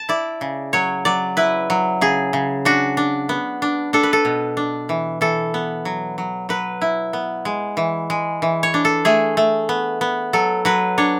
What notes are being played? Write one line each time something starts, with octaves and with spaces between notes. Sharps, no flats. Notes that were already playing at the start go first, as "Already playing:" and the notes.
Already playing: A5
E4 D5
C#3
F#3 C#5
F#3 D5
E4 B4
F#3
C#3 G#4
C#3
D4 F#4
D4
B3
D4
D4 A4
B4
A4
B2
D4
E3
E3 A4
B3
F#3
F#3
F#3 B4
E4
B3
G#3
E3
G#3
E3
C#5
D4
A4
A3 G#4
A3
B3
B3
F#3 A4
F#3 B4
D4 C#5